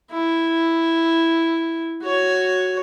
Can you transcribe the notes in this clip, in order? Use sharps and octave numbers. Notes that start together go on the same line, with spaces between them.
E4
F#4 C#5